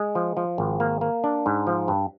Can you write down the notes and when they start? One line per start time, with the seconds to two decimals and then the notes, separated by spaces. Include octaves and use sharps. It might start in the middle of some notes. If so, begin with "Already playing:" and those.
Already playing: G#3
0.15 F3
0.37 F3
0.58 G#1
0.80 A#3
1.01 A#3
1.24 D4
1.46 G#2
1.67 F3
1.88 G2